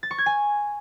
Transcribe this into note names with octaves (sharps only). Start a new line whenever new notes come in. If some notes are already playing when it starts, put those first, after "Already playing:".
A6
C#6
G#6
G#5